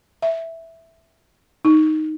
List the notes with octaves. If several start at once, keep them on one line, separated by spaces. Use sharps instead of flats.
E5
D#4